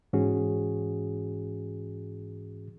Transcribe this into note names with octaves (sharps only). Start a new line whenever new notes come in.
G#2 E3 C#4 F#4 G#4